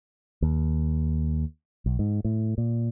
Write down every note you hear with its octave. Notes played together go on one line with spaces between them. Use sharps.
D#2
B1
G#2
A2
A#2